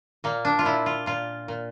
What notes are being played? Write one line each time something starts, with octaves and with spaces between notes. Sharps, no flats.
A#2 A#3
D4
F4
A#2 E4
F4
A#2 F4
A#2